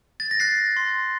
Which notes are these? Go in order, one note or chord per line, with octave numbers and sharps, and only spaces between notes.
A6
A#6
F#6 A6 C7
C6